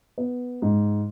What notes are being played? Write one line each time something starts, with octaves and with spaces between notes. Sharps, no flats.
B3
G#2